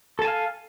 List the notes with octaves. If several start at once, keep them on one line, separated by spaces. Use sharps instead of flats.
A4 F5 G#5 A5